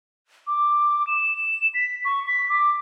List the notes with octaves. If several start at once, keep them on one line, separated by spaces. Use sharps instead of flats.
D6
E7
E7
B6
C#6
B6
D6